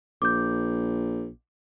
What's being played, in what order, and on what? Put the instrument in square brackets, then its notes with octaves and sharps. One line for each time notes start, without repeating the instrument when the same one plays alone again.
[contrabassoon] A#1 [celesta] D6 G6